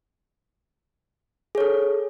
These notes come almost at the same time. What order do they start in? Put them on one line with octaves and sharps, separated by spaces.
G#4 C#5 A4